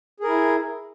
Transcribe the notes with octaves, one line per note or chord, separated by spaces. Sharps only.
E4 G#4 A#4